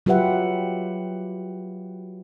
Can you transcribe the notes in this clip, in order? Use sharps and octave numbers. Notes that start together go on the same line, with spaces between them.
F#3 F4 G4 B4 E5 F#5